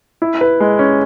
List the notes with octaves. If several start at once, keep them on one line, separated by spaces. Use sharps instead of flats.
E4
B4
G#3
C#4